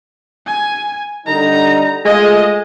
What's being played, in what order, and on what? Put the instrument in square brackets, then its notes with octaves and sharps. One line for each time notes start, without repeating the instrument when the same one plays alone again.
[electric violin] G#5
[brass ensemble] D3 G3 D#4 [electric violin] A#5
[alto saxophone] G#3 [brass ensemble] A3 F4 G#4 [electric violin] D#5